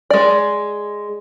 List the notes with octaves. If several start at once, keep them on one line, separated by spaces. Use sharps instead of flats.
G#3 D5